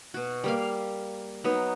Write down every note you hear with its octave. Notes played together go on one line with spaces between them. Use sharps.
B2 F#4
G3 A#3 F5
F#3 B3 D#4